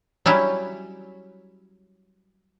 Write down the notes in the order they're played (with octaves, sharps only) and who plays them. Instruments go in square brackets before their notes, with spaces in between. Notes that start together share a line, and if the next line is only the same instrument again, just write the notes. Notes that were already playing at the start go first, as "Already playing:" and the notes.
[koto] F#3 G3 C#4 E4